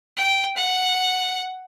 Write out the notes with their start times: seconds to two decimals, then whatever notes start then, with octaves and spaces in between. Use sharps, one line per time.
0.16 G5
0.56 F#5